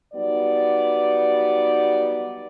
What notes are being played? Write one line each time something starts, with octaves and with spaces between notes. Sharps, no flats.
F#3 G3 B3 D#4 D5